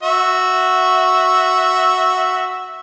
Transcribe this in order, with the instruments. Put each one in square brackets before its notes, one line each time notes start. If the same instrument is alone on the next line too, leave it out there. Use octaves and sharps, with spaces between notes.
[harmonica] F#4 E5